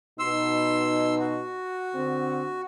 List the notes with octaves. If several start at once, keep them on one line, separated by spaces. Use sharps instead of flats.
B2 D#4 C6 E6
F#4
D3 C4